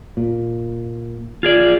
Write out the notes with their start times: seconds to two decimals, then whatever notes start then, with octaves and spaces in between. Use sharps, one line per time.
0.17 A#2
1.43 F4 G#4 D5